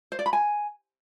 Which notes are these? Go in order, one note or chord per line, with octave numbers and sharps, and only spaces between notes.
C5
D5
B5
G#5